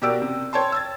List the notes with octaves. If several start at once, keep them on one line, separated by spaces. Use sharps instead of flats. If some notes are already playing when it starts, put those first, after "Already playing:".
B2 G4 A#4 D5 E6 D7
C3
C#5 G5 A5 C6
E6 G#6 A6